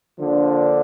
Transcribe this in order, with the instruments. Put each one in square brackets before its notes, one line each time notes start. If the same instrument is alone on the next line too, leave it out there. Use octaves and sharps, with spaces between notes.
[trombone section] D3 F3 A#3 D4